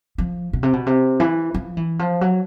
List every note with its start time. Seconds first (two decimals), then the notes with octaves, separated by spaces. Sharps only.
0.18 F3
0.53 B2
0.63 C3
0.73 B2
0.86 C3
1.20 E3
1.54 F3
1.77 E3
1.99 F3
2.21 F#3